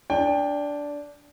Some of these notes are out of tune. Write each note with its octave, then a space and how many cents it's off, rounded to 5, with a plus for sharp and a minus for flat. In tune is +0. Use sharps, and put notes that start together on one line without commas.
D4 -10 G5 +20